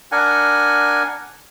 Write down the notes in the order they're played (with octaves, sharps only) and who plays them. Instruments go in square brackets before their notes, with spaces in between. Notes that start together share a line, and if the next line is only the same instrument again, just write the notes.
[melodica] D4 A#4 F#5 G#5